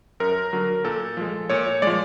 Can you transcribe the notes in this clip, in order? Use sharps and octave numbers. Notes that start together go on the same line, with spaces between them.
F#2 A#4
D3 F#3
A#2 A4
F3 G#3
A#2 C#5
F3 G#3 D5